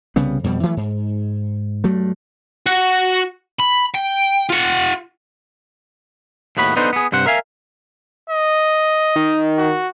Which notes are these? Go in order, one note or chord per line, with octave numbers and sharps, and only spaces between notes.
C2 C#3 G3 B3
F2 B2 G3
E3 F#3 A3
G#2
G2 F#3 A3
F#4 F#5
B5
G5
F4 F#5
D#2 A2 B3 F#4 B5
B3 D4 D#4 A4 B4 C5
B3 G#4
G2 C3 C5 F#5
A#4 E5 F5 G#5
D#5
D#3
F#4